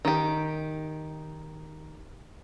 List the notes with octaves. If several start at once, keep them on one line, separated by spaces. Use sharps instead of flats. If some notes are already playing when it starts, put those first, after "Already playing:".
D#3 G4